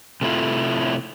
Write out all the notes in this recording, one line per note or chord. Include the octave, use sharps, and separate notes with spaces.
C3 A3 E4 F4